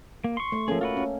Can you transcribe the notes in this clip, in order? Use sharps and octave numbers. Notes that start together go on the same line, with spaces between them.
A#3
C6 C#6
A3
F3 A#3 C#4 G#4 A4
F4 F#4 B4
C#4